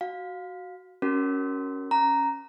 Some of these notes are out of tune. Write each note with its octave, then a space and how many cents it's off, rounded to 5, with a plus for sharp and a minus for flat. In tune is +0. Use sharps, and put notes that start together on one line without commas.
F#4 +5 F5 +20
C#4 +0 F#4 +20 A#4 +0
C#4 +0 A#5 +0